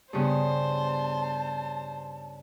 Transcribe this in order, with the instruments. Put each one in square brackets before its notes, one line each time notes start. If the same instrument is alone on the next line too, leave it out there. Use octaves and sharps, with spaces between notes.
[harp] G2 C#3 B3 [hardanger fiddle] C5 [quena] A5